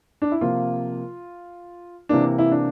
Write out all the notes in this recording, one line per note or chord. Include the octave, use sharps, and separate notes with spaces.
D4
E4
C3 F3 A#3 F4
C3 E3 A#3 D4
E4
D4